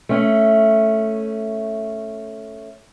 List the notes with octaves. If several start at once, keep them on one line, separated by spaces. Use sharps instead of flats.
A3 C#4